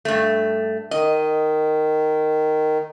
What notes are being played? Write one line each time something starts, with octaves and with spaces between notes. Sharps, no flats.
G2 A3
D#3 D#5